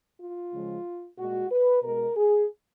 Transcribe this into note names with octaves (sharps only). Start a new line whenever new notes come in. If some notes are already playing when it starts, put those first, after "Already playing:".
F4
C#3 F3 G#3
A#2 G#3 F#4
B4
B2 G#3 A#4
G#4